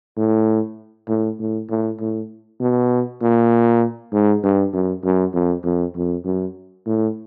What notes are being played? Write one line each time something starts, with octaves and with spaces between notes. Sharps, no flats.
A2
A2
A2
A2
A2
B2
A#2
G#2
G2
F#2
F#2
F2
F2
F2
F#2
A2